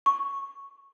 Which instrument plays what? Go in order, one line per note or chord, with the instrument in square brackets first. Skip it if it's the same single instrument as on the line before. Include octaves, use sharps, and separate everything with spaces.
[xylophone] C#6